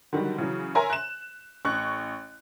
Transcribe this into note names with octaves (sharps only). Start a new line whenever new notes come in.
D3 D#3 F#3 G3
C#3 E3 F#3
A#4 C#5 E5 G#5 A#5 C6
F#6 E7
A1 C#6 F#6